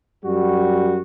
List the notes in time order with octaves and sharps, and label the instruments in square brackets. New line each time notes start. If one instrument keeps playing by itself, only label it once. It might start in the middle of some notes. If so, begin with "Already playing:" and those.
[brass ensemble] F#2 G3 F#4